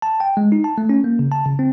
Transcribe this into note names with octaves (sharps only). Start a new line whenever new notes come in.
A5
G5
G#3
D#4
A5
A3
C#4
A#3
C#3
A5
C#3
C4